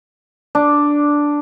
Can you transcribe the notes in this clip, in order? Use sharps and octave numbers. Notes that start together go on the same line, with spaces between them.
D4